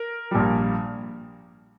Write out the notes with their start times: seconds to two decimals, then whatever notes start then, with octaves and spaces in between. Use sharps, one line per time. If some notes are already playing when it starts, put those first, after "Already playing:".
Already playing: A#4
0.31 A#1 A#2 G3